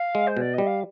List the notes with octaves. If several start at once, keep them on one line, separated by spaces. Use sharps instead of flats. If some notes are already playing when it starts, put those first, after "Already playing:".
Already playing: F5
G#3
C5
B2 D5
G3 D#5
F5